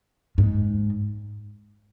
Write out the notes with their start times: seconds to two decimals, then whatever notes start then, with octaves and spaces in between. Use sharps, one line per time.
0.38 G#2